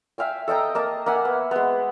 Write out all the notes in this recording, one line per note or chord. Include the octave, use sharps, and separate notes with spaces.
E5 F5 G5 G#5
A4 D#5 G5 A#5
A#3 D#5 A5
A#3 E5 F#5 G#5
B3
G#3 B3